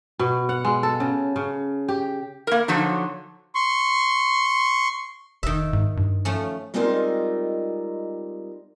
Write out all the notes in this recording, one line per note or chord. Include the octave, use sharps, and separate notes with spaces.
B2
F#5
G#3
A4
C#3
C#3
G4
A#3 A#4
D3 F3 F#3 D#4
C6 C#6
F1 D#3 E5
G#2
G2
F3 A3 C#4
G3 G#3 C4 D#4 F4 A#4